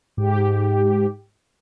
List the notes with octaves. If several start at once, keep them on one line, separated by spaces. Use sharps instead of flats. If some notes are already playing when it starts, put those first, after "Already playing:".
G#2 G4